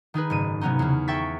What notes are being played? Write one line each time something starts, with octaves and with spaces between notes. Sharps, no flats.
D#3 D#4 G#4 B4
F#1 G#2 D#7
C3 F#3 B3 C#4 D#4
E2 C#3
E5 G5 C#6 G#6 A6 B6